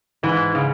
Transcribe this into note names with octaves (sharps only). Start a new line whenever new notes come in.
G#2 E3
C#3